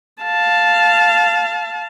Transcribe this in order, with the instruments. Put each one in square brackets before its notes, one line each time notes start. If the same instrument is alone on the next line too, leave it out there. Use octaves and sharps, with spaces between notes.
[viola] F5 A5